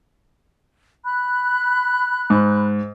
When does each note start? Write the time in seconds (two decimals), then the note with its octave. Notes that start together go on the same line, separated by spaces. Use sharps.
1.03 B5 F#6
2.30 G#2